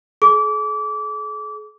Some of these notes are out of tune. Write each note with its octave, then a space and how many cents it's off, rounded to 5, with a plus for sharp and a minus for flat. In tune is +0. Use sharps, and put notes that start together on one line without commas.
G#4 +45 D6 -25